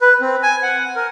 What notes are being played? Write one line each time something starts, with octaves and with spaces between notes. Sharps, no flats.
B4
C4
G#5
F#5
A#4